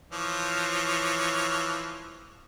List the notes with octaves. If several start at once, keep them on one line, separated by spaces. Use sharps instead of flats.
E3 F3 C#5